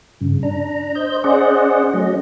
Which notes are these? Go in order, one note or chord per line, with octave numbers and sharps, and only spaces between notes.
G2 C#3
D4 A#5
C5 D#5 G6
C#4 G#4 C5 D5 D#5 F#5
F#3 A3 C#4 D#5